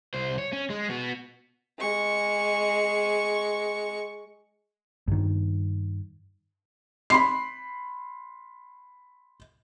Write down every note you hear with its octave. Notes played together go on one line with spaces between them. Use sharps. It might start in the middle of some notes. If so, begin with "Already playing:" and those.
C2 C5
C#5
C#4
G#3
B3 F#4
G#3 C#6
G2 D#3
B5 C6 C7